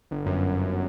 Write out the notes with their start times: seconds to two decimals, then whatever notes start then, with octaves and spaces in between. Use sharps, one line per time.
0.11 G1
0.26 F#2
0.40 G1
0.54 G1